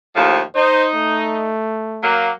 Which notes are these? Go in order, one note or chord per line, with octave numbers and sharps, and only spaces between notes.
D#2 A2 F3
D#4 C5
A3
F#3 A#3